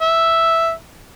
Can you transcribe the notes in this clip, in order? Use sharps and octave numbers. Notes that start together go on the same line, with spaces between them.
E5